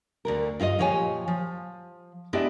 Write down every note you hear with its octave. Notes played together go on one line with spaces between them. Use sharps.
D2 D3 A#4
G2 F4 C#5 D#5
A#2 F3 G4 C#5 G5 G#5
F3
G#3 B3 D4 E4 G4 D#5